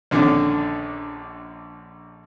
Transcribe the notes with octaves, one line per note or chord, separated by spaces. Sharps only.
A#1 D3 D#3 C#4 D4 D6